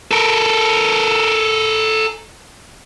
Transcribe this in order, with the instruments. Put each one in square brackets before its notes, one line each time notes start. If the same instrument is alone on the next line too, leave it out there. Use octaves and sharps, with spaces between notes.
[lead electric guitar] A4 A#4